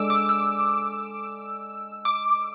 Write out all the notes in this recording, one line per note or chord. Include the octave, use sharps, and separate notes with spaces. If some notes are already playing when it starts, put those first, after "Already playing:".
Already playing: G#3 D4 A4 D5 D6 E6
D6
E6
D6